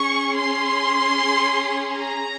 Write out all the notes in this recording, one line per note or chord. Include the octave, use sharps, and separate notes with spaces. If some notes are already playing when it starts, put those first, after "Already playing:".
Already playing: C#4 G#4 C#6
C6
A#5